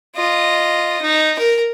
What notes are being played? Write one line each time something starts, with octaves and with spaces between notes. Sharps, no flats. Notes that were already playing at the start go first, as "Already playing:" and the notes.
F4 D#5
D#4
A#4